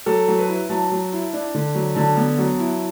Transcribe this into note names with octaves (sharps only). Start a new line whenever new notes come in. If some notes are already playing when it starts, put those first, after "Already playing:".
F#3 A4
F#3
B4
E4
F#3 A5
F#3
E4
D4
D3
F#3
D3 A5
B3
F#3
E4